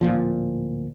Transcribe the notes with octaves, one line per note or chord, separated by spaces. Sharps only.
D1 G1 A#2 F3